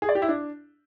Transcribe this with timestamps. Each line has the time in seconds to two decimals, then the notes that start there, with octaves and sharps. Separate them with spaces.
0.02 G#4
0.09 D5
0.15 G4
0.22 E4
0.29 D4